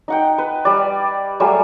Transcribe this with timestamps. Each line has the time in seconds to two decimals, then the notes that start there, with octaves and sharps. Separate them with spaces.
0.08 D#4 F#5 G5
0.38 B4
0.65 G3 D5
1.40 F#3 G3 A3 G#4